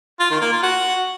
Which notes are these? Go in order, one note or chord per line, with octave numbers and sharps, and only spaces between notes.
F4
D#3
A#3
F4
F#4